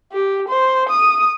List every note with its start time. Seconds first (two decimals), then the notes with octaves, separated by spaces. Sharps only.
0.12 G4
0.48 C5
0.89 D#6